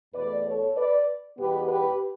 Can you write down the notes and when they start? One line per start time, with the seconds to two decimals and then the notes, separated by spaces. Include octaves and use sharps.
0.14 E2 B2 A3 B4 D5
0.45 A4 C#5
0.76 B4 D5
1.37 E2 B2 G3 B3 G4 B4
1.68 G4 B4